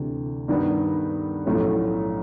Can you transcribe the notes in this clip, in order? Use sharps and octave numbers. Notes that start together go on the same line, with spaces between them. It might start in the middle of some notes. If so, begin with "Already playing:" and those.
Already playing: D2 C3 E3
G2 D#3 G3 B3
B1 A2 F3 A3 C#4